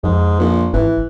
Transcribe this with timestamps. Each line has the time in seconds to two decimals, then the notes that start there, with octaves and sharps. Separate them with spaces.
0.04 F2 G#2
0.40 A#1
0.74 G#1 E3